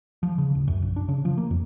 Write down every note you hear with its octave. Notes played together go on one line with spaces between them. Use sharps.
F3
C#3
D1
F#2
A#1
D4
C#3
F3
A#3
F2